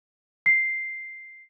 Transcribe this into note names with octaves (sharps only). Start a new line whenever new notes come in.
C7